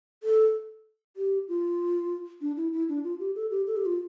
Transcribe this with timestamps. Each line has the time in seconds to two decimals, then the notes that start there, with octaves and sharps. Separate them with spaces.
0.23 A4
1.17 G4
1.48 F4
2.41 D4
2.57 E4
2.73 E4
2.89 D4
3.04 F4
3.20 G4
3.35 A4
3.51 G4
3.67 A4
3.77 G4
3.86 F4